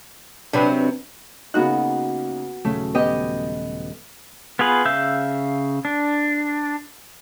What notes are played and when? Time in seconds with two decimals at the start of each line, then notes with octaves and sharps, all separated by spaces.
0.53 C3 F#3 D4 B4
1.54 C#3 A#3 B3 D#4 F#4 F#6
2.65 D#1 C#3 F#3 A3
2.95 B3 G4 D#5 G5
4.59 B3 F4 G#4 B4
4.85 C#3 E5 F5 E6 G6
5.85 D4